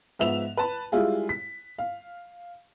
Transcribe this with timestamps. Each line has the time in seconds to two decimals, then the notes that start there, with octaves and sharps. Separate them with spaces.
0.19 G#2 F3 B3 E5 E7 F7
0.57 B4 A5 B5
0.92 G3 G#3 E4 F4 G#4
1.29 B6
1.78 F5